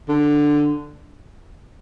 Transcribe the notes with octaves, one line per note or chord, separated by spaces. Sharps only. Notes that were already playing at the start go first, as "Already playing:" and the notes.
D3